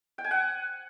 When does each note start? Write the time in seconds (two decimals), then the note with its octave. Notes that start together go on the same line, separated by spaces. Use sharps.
0.18 G5
0.24 G#5
0.31 F#5